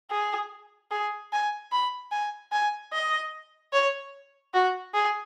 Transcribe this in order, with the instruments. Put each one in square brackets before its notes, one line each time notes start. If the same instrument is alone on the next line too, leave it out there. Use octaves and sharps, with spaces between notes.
[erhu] G#4
G#4
G#5
B5
G#5
G#5
D#5
C#5
F#4
G#4